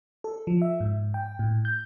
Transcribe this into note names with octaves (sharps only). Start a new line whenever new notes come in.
A4
F3
E5
G#2
G5
A2
G6